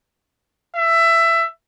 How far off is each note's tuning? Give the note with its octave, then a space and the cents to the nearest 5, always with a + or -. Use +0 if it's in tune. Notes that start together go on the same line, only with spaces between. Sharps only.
E5 +15